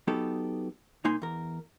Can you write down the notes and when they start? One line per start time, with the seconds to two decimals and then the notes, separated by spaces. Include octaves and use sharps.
0.08 F#3 B3 D#4 G4 A4
1.04 C2 A#3 D#4 G#5 C6
1.22 E2 A#4